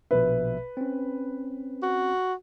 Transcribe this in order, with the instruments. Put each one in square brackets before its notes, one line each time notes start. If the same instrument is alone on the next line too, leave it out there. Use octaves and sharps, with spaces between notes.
[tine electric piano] A#1 B2 E5 [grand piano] B4
[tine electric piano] C4 C#4
[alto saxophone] F#4